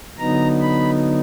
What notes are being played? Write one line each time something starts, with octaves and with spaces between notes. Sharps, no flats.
D3 F#3 B3 D#4 A#5
B5